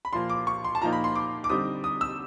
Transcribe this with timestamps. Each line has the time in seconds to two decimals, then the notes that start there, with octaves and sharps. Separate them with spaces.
0.05 B5
0.13 A#2 F3 A#3 C6
0.30 D6
0.47 C#6
0.64 C6
0.75 A5
0.81 A#2 F3 A#3 D#4 A#5
0.93 B5
1.04 C6
1.15 D6
1.44 D6
1.50 D3 G3 C4 D#4 D#6
1.84 D#6
2.01 E6